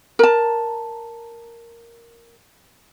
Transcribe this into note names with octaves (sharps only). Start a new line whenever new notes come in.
A#4 A5